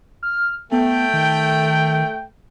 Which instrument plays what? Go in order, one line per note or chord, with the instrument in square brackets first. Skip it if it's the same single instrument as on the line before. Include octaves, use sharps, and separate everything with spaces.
[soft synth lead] F6
[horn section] A3 G5 [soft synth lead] B3
[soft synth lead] D#3